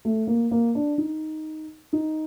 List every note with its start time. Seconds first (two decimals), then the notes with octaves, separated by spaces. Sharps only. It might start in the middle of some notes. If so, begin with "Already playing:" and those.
0.05 A3
0.27 A#3
0.51 A#3
0.75 D4
0.98 D#4
1.93 D#4